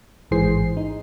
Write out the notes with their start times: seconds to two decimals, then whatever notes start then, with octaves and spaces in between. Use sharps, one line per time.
0.31 A1 G#2 E3 G#4 C5 C7
0.77 D#4